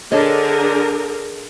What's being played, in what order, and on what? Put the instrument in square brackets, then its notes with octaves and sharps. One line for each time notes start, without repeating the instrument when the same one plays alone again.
[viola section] D3 G#4 A#4 [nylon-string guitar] D4 C#5 D#5